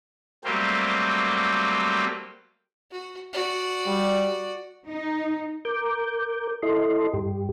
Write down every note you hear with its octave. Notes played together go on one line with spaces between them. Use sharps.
F#3 G3 A3 A#3 C4 G4
F#4
F#4 D5
G3
D#4
A#4 D6 G6
E4 A4 D#5 C6
G2 G4